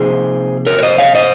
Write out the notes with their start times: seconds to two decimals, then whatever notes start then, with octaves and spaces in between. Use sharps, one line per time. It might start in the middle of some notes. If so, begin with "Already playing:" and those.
Already playing: C3 F3 A#3 D#4 G#4 C5
0.67 A#4 C#5
0.79 C#5
0.83 C5 D#5
0.98 C#5 F5
1.15 C5 D#5